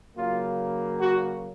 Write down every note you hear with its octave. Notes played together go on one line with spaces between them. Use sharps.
C#3 F#3 A#3 F4
F#4